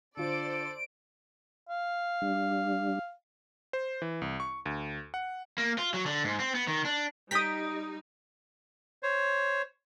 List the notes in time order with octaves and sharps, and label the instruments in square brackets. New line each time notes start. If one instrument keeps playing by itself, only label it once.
[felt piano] D3 F4 [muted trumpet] A4 [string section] C5 D5 [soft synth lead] D7
[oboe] F5
[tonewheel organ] G3 D4
[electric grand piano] C5
E3
C2
C#6
D2
F#5
[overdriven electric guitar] A#3
F4
F#3
D3
G#2
C4
B3
D#3
D4
[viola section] G3 D#4 [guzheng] C5 G5 A#5 [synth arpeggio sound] D#6 B6
[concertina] C5 C#5